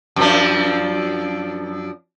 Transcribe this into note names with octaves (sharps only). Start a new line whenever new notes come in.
F#2 F3 D4